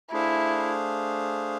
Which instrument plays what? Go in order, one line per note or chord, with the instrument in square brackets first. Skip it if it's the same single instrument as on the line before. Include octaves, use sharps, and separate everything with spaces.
[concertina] A3 D4 G#4 C5 F5 [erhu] E4